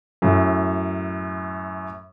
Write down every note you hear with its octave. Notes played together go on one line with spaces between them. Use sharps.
F#2 A2